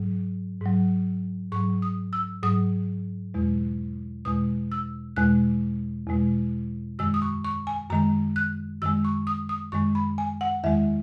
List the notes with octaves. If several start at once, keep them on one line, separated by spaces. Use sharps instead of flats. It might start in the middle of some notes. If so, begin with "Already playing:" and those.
Already playing: G#2 F#3
G#2 F#3
G#2 F#3 C#6
D#6
E6
G#2 F#3 D#6
E2 B2 G#3
E2 B2 G#3 D#6
E6
E2 B2 G#3 F#6
E2 B2 G#3
F#2 D#3 G#3 E6
D#6
C#6
C#6
G#5
F#2 D#3 G#3 A#5
F#6
F#2 D#3 G#3 E6
C#6
D#6
D#6
F#2 D#3 G#3 C#6
B5
G#5
F#5
E2 D#3 G#3 E5